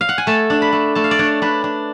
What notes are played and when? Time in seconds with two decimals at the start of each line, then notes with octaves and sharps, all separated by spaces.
0.01 F5
0.09 F#5
0.18 G#5
0.27 A3 A5
0.50 D4
0.62 B5
0.73 A3
0.95 A3 A5
1.04 F5
1.11 D5
1.19 D4 C#5
1.42 D4 B4
1.64 D4